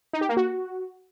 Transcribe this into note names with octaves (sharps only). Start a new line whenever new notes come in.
D#4
G4
A#3
F#4